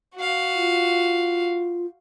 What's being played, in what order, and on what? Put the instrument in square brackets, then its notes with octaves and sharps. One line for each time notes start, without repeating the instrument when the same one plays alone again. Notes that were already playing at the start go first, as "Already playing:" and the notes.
[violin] F#4 F5
[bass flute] F4